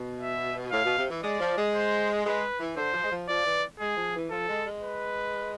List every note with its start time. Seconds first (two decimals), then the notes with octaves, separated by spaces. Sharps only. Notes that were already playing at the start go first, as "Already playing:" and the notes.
Already playing: B2
0.20 E5
0.71 A2 F5
0.84 B2
0.98 C3
1.10 E3
1.23 G#3 D5
1.40 F3
1.57 G#3
1.75 C5
2.25 G#3 B4
2.60 E3
2.77 D3 C5
2.94 F3
3.04 G#3
3.12 F3
3.28 F3 D5
3.45 E3
3.80 G#3 G#4
3.97 F3
4.14 E3
4.30 F3 A4
4.48 G#3
4.65 G#3
4.82 B4